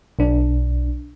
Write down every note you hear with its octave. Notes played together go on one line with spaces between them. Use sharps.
B1 D4